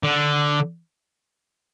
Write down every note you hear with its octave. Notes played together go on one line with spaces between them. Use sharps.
D3